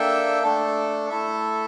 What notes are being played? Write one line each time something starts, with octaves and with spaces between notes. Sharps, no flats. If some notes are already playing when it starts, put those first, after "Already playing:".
Already playing: A#3 D4 A4 E5 G5
A3 D4 A4
A3 E4 A4 E5